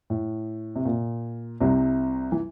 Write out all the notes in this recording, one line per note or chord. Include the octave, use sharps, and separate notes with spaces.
A2
C3
A#2
C2 C3
E3